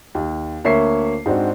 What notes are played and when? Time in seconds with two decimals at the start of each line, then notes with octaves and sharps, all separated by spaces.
0.15 D#2
0.64 D2 A#3 C#5 E5 C#6 C7
1.26 G#2 C4 D4 F#4